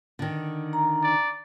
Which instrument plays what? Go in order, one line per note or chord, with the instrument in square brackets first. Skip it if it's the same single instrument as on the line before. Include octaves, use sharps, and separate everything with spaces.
[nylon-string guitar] D3 D#3
[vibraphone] A#5
[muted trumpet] D5